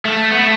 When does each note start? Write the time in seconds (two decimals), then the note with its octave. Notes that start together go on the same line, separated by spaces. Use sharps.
0.05 A3
0.32 B3
0.38 A3